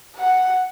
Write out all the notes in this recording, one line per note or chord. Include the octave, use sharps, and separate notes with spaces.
F#5